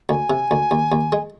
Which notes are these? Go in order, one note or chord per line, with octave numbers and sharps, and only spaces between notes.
D2 G#5
C3
D2
D#2
D#2
G#3